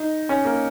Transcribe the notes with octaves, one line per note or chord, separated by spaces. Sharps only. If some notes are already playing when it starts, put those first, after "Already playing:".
Already playing: D#4
C#4
A#3